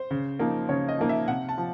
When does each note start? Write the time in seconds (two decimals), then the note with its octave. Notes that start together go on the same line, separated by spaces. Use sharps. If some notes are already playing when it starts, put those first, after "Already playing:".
Already playing: C5
0.11 C#3
0.39 F3 A#3 D#4
0.69 C#3 C#5
0.88 D#5
0.98 F3 A#3 D#4
1.09 E5
1.28 C3 F#5
1.49 A5
1.58 F3